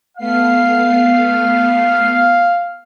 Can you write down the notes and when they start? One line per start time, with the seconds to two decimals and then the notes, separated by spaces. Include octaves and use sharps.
0.18 A3 B3 F5 C7